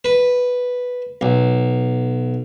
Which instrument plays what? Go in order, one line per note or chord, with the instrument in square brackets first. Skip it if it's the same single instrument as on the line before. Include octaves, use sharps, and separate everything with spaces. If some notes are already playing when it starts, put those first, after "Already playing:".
[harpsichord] B4
B1